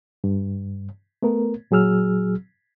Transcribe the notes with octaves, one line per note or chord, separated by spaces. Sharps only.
G2
A3 B3 A#4
A#2 F#3 G#4 E6 F6